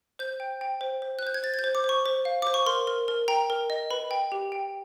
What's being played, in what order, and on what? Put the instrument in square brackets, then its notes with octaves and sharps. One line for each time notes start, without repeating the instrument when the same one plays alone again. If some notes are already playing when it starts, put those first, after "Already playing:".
[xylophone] C5 G6
G5
G5
C5
C5
F#6
C5 G6
G#6
C5 A6
G#6
G6
C5
D6
C5
C#6
C5
F5
C5 D6
C#6
A#4 C6
A#4
A#4
G5 A#5
A#4
D#5
B4 B5
G5
G4
G5